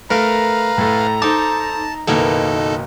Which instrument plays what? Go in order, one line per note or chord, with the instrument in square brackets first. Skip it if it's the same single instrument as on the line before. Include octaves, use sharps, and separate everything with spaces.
[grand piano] A3 [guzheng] A#4 [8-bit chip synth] B4 F5 [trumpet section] A#5
[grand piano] A2 A3
[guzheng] D#4 [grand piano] A4 C5 D6 [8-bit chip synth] A5
[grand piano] F#1 D#3 [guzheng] B2 A#3 E4 [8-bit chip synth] D#4 A4